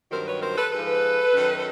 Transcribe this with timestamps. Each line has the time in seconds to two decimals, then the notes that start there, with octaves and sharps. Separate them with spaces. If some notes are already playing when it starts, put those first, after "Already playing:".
0.11 G2 D#3 F#3 A#4 C5
0.26 B4 C#5
0.41 A#4 C5
0.57 A4 B4
0.72 G#2 F3 A4 B4
1.34 F#2 D#3 F#3